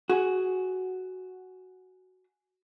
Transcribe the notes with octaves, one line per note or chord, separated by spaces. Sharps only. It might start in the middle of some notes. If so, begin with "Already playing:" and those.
F#4 G#4